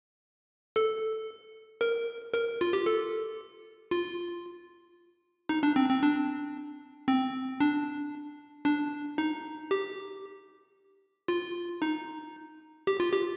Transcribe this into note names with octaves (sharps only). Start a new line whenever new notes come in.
A4
A#4
A#4
F4
G4
A4
F4
D#4
D4
C4
C4
D4
C4
D4
D4
D#4
G4
F4
D#4
G4
F4
G4